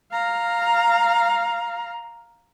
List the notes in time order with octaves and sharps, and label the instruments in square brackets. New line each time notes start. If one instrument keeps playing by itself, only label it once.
[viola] F5 A#5